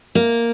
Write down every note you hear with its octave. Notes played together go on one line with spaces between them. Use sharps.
A#3